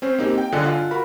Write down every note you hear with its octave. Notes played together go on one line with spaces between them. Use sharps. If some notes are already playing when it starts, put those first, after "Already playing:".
C4 C#4 C5
A#3 C4 D#4 G4
G5
G1 D3 F4 D#5 G#5 F#6
F4
F#4 A#4 B5